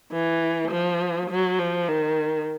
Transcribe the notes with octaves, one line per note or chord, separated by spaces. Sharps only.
E3
F3
F#3
F3
D#3